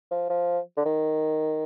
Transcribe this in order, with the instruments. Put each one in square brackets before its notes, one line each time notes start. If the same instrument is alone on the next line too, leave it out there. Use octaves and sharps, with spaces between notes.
[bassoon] F3
F3
D3
D#3